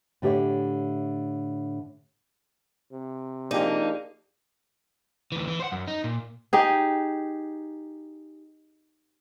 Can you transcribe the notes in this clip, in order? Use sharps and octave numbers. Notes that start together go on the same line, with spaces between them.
A2 D3 G4 A#4 C#5 E5
C3
F3 A#3 D4 D#4 G4 G#4 D5
D2 E3
E3
C5 F#5
F#2
D#4
A#2
D#4 G4 G#4